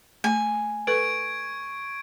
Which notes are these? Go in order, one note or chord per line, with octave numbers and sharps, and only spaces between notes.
A3 G#5
A4 B4 C#6 G#6 D7